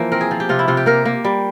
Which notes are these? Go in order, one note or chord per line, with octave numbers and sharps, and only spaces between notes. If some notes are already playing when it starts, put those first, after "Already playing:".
Already playing: E3 F3 A#3 C5
C4 A#4
G#4
F3
G4
C3 F4
E4
C3 F4
G4
A#3 A#4
A#3
G3